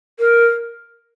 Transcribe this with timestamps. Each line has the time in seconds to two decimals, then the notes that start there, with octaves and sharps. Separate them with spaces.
0.19 A#4